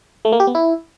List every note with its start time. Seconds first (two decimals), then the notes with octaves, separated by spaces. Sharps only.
0.25 A3
0.32 A#3
0.40 G4
0.47 B3
0.55 E4